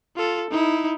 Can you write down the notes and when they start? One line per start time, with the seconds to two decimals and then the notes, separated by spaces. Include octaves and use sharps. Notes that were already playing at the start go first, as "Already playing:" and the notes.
0.16 F4 A4
0.51 D#4 E4